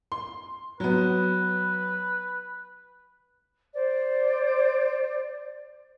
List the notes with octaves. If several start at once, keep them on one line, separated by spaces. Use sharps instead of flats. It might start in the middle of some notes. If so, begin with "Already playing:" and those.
C6
F#3 B3 B4
C5 D5